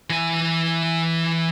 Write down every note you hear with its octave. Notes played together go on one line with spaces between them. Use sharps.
E3 G#5